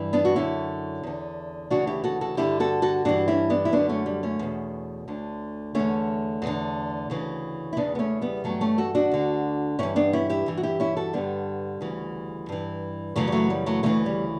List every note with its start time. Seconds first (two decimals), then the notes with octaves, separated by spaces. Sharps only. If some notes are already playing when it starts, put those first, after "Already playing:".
Already playing: G2 E3
0.13 B3 D4
0.25 F#4
0.36 F#2 D3 C#4 E4
1.03 E2 D3
1.70 D2 C#3 E3 D4 F#4
1.87 E4 G4
2.04 F#4 A4
2.21 F#4 A4
2.37 G2 D3 E4 G4
2.60 F#4 A4
2.82 F#4 A4
3.05 G2 E3 D4 F#4
3.28 C#4 E4
3.50 B3 D4
3.65 E4
3.73 F#2 D3 B3 D4
3.89 A3 C#4
4.06 G3
4.23 A3 C#4
4.39 E2 B2
5.08 D2 D3
5.75 E2 D3 A3 C#4
6.42 E2 D3
7.10 D2 C#3 E3
7.73 E4
7.77 E2 C#3 E3 B3 D4
7.95 B3
7.99 A3 C#4
8.22 G3 B3
8.44 G2 E3 F#3 A3
8.61 A3 C#4
8.78 F#4 A4
8.95 D4 F#4
9.12 D2 D3
9.79 G2 E3 C#4 E4
9.96 B3 D4
10.13 C#4 E4
10.30 E4 G4
10.46 G2 E3
10.57 F#4
10.63 E4 G4
10.80 C#4 E4
10.97 F#4 A4
11.13 G2 D3 G3 B3
11.81 D2 C#3 E3
12.49 G2 E3
13.16 F#2 C#3 E3 F#3 A3
13.28 G3
13.32 F#3 A3
13.50 G3
13.66 F#3 A3
13.83 D2 C#3 E3 F#3 A3
14.06 G3